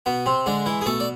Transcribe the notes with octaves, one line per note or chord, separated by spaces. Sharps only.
B2 B3
C3 C4
D3 G#3 D4
E3 E4
G#4
B2 A3 A4
D5